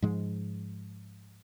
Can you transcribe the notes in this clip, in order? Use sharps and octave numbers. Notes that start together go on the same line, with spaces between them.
G#2 F3 G#3